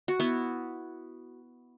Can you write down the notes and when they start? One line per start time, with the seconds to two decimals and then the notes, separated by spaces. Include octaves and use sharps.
0.08 F#4
0.20 B3 E4